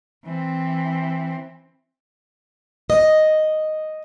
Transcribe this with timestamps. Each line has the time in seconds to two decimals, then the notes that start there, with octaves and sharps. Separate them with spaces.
0.25 E3 C4
2.90 D#5